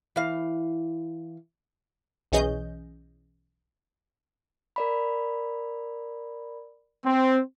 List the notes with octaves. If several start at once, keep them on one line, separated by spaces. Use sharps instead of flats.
E3 F5
B1 E3 C#4 G#4 D#5 G6
A#4 D5 B5
C4